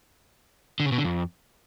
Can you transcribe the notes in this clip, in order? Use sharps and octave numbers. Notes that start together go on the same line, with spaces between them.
D3
C#3
B2
D3
F2